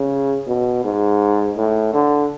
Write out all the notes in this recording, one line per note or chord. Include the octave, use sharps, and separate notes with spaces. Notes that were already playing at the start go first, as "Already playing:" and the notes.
Already playing: C#3
B2
G#2
A2
D3